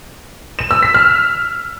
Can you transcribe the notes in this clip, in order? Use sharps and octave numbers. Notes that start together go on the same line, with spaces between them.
E7
E6
B6
F6